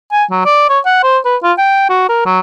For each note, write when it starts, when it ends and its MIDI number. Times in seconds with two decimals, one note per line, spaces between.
0.12 0.24 80
0.31 0.42 54
0.45 0.67 74
0.69 0.79 73
0.86 1.02 78
1.04 1.18 72
1.26 1.37 71
1.44 1.53 65
1.58 1.86 79
1.90 2.09 66
2.09 2.23 70
2.26 2.40 54